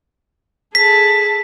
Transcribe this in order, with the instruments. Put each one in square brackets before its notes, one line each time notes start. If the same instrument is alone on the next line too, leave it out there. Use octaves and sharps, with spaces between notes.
[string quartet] G#4 A4 A5 [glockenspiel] B6